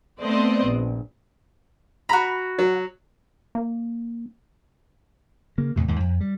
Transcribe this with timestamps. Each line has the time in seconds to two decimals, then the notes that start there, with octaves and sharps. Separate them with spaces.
0.20 A3 B3 C4 C5 D5 D#5
0.64 A#1
2.09 F#4 A#5 B5
2.58 F#3
3.55 A#3
5.58 C#3 A#3
5.76 E2 A2 C3
5.88 D#2 G#2
6.00 F2
6.21 G3